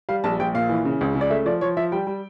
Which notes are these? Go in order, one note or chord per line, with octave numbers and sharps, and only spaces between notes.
G3 F5
A#1 A5
A#1 G5
A#2 F5
E3
C#3
C#2
C#3
D5
A3 E5
F3 D5
F3 C#5
F3 E5
G3 G5
G3